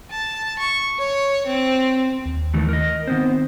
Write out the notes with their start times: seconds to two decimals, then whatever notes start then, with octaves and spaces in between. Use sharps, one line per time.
0.11 A5
0.59 C#6
0.99 C#5
1.46 C4
2.26 D#2
2.54 D#3 E3 A3
2.69 A#4 D#5
3.08 D#3 B3 C4 C5